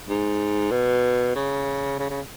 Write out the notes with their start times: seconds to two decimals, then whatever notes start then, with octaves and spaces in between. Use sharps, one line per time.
0.08 G#2
0.71 B2
1.35 C#3
1.99 C#3
2.10 C#3